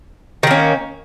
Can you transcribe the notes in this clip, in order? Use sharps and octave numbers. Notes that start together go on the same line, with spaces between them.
D#3 A#3 C#4